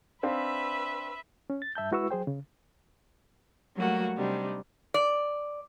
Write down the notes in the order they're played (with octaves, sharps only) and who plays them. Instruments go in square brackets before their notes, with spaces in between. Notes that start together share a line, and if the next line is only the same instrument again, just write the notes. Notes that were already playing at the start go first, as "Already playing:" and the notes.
[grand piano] C4 D4 F5 [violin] B4 E5
[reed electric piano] C#4
A6
G2 E5 A5 G6
G#3 E4 F#4 B4 C#6 E6
F#3 G#4 C5 G5
C#3
[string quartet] F#3 G3 A3 A#3 F#4
C3 G3 D4 D#4
[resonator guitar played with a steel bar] D5